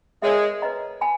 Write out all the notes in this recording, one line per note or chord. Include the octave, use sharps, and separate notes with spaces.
G#3 A#4 C#5 E5
B4 D#5 A#5
G#5 B5